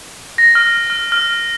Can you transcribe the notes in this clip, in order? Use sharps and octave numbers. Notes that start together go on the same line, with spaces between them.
A#6
F6
F6
F6